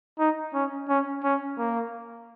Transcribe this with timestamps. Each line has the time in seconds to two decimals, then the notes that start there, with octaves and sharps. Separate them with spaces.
0.19 D#4
0.54 C#4
0.89 C#4
1.24 C#4
1.58 A#3